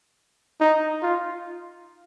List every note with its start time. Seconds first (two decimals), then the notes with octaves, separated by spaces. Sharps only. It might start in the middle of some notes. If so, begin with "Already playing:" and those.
0.61 D#4
1.02 F4